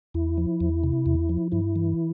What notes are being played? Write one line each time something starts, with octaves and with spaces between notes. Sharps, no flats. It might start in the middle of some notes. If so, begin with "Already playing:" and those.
E2 E4
F3
E2
C3
E2
F3
G2 E4
E3